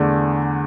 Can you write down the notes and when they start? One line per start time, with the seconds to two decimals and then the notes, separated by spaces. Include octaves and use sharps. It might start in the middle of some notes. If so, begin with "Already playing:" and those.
Already playing: E2 D3 A3 D4